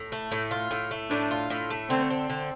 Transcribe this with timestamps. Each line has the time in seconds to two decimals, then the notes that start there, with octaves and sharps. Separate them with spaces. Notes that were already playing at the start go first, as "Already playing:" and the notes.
Already playing: A2
0.12 A3
0.32 A2
0.51 F4
0.71 A2
0.91 A3
1.10 A2 D4
1.31 F4
1.50 A2
1.70 A3
1.90 D3 C4
2.10 C4
2.30 D3